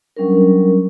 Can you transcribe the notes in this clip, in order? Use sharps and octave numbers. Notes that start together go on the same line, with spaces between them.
F#3 G3 C#4 D4 A#4